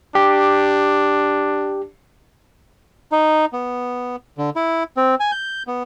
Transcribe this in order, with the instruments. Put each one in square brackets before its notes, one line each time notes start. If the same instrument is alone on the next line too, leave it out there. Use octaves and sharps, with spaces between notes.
[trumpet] D4 [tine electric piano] G4
[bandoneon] D#4
B3
D3
E4
C4
G#5
G6
B3